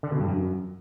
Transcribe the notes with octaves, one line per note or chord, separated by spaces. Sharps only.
D3
B2
G2
F#2